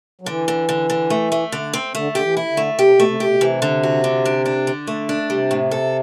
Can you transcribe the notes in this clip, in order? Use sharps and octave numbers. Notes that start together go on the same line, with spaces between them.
F#3
D3 E3
D3
D3
D3
A3
A3
D3
C4
D3 A3
D3 G4
E3
E4
D3
A3
C3 G4
B2
A3
C3
C3 G4
B2
C3
E3
D3
F#4
D3
D4
D4
D3
A3
D4
C3 G3
A2
A4